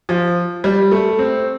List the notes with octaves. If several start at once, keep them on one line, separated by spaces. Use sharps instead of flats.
F3
G3
A3
C4